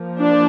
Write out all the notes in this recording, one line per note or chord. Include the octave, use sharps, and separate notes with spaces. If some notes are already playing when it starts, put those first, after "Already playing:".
Already playing: F3 A#3
D4